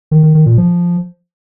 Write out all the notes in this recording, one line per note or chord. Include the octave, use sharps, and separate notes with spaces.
D#3
D#3
D#3
A#2
F3